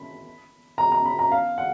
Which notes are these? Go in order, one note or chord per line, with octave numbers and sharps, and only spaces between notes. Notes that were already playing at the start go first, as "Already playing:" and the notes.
Already playing: B5
A#5
A#5
B5
A#5
F5
F#5